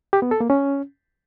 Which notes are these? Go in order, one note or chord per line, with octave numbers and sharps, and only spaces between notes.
G4
B3
A4
A#3
C#4